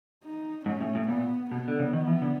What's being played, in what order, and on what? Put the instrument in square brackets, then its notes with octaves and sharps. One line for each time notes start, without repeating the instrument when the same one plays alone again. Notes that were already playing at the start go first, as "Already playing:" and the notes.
[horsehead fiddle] D#4
[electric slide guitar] G#2 [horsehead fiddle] C#4
[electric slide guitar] A2
A2
[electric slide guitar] A#2 [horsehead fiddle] B3
[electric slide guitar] B2 [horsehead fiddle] B3
[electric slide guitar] D3
C#3
D#3
E3
D3